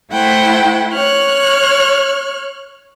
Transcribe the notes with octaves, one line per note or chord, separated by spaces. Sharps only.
A3 E4 C5 F#5 G5
C#5 F6 F#6